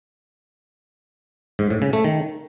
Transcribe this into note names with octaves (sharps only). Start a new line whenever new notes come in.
G#2
A2
C#3
A3
D#3